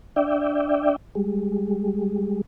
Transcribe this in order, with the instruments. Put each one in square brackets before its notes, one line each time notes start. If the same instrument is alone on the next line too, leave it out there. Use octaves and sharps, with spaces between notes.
[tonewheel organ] D4 D5 E5 G5
G3 G#3